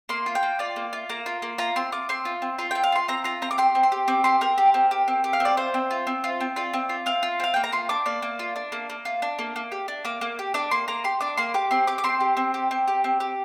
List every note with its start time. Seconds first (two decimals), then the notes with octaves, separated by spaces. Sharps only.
0.09 A#3 C6
0.26 F4
0.35 G5
0.43 A#3
0.59 F4 D5
0.76 A#3
0.93 F4
1.09 A#3 A#5
1.26 F4
1.42 A#3
1.58 F4 A#5
1.76 C4 C6
1.92 F4 D6
2.09 C4 C6
2.25 F4
2.42 C4
2.59 F4 C6
2.71 C4 G5
2.84 F5
2.92 F4 C6
3.08 C4 A#5
3.24 F4 A#5
3.42 C4 A#5
3.51 D6
3.58 G4 C6
3.75 C4
3.83 C6
3.92 G4
4.08 C4 D6
4.24 G4 C6
4.41 C4 A#4
4.58 G4
4.74 C4
4.91 G4
5.08 C4
5.24 G4
5.33 F5
5.40 C4
5.45 D5
5.57 F4 C5
5.74 C4
5.91 F4
6.07 C4
6.24 F4
6.41 C4
6.56 F4 D5
6.73 C4
6.89 F4
7.06 C4 F5
7.23 F4
7.40 C4 F5
7.54 A#3 G5
7.64 A#5
7.72 F4 C6
7.89 D4 D6
8.06 A#3 D5
8.22 A#3
8.39 F4
8.56 D4
8.72 A#3
8.90 A#3
9.05 F4
9.22 D4
9.39 A#3
9.56 A#3
9.72 G4
9.88 D4
10.05 A#3 D6
10.21 A#3
10.39 G4
10.54 D4 D6
10.71 A#3 C6
10.88 A#3 A#5
11.04 G4 C6
11.21 D4 D6
11.37 A#3 C6
11.54 G4 D6
11.71 C4 C6
11.87 G4 D6
11.98 D6
12.04 C4 C6
12.20 G4
12.37 C4
12.54 G4
12.71 C4
12.88 G4
13.04 C4
13.20 G4